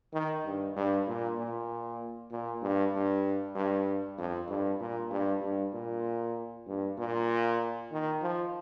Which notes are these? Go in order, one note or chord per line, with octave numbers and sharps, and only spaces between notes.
D#3
G2
G2
A#2
A#2
A#2
G2
G2
G2
F2
G2
A#2
G2
G2
A#2
G2
A#2
D#3
F3